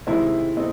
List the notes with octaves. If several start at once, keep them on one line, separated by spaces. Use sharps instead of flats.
C3 D#3 G#3 C4 E4
C4 D#4